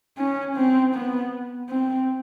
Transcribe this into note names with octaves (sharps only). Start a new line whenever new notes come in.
C#4
C4
B3
C4